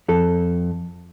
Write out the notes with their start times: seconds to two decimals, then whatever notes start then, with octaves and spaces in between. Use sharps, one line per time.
0.08 F2 A4